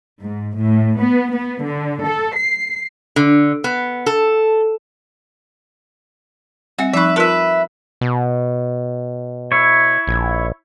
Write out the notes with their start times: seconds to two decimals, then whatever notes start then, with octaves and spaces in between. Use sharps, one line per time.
0.21 G#2
0.58 A2
0.98 B3
1.34 B3
1.66 D3
2.05 A4
2.35 C7
3.16 D3
3.64 B3
4.06 A4
6.79 G3 C4 F#4 E5
6.93 F3 D#4 B4 E5 C#6
7.16 F4 A#4 B4 E5 A5
8.01 B2
9.52 E4 C#5
10.07 A#1